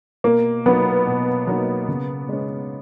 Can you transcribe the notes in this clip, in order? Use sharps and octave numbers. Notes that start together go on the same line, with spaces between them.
B2 A#3
F#3 A#3 B3 D#4
B2
F#3 A#3 D#4
C#3
G#3 C#4